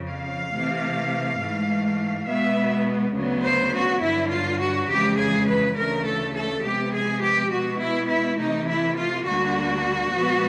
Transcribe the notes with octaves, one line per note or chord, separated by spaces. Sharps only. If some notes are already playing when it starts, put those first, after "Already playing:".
Already playing: F2 C#3 F3
F5
C3 E3 A3
G#2 E3 A3
B2 G#3 B3 E5
D2 C#3 F#3 B3
C5
F#4
G2 D3 F#3 E4
F4
F#4
F2 C#3 E3 G#3 G4
G#4
B4
D2 C#3 E3 A3 A#4
A4
A4
C3 F3 G#3 B3 G4
G#4
G4
B2 G#3 B3 F#4
E4
E4
C3 E3 A3 D#4
E4
F4
D2 D3 G3 A#3 F#4
A#2 F3 G#3 B3